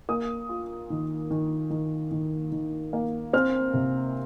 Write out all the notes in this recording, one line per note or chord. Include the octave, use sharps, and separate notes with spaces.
A#3 D#6
F4
D#3
D#3
D#3
D#3
D#3
A#3
C4 F6
C3